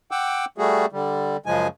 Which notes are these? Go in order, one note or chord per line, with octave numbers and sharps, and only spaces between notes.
F#5 G5 D6 E6
G3 A3 F#4 G#4
D3 G3
F#2 C#3 F3 G#3 G#5